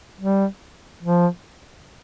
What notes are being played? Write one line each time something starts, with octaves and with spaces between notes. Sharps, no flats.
G3
F3